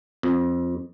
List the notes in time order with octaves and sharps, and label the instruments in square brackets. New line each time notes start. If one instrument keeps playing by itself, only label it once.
[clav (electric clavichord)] F2